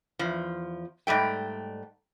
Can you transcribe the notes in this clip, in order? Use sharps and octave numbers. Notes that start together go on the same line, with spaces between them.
E2 F3
G#2 G3 A3 G5